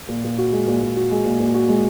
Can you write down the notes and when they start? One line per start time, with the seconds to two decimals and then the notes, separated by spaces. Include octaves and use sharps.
0.08 A#2
0.24 A#2
0.38 F#4
0.53 G#3
0.67 A#2
0.81 A#2
0.97 F#4
1.11 G#3
1.25 A#2
1.40 A#2
1.54 F#4
1.69 G#3